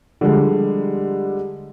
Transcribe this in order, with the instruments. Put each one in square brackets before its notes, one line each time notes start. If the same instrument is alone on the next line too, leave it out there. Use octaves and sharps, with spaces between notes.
[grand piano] D3 F3 G3 G#3